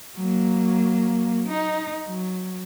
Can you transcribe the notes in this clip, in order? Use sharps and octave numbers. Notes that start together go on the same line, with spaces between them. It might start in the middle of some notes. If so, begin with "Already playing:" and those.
F#3 A#3
D#4
F#3